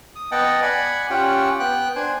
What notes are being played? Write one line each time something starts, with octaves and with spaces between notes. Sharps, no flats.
D#6
B3 D#5 F#5 G5 A5
D5 F#5 G#5 B5
C#4 F4 G4 F#5 G5
B3 G5 F#6
D4 C5 G#5